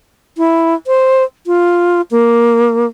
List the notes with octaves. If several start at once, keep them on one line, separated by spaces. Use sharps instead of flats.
E4
C5
F4
A#3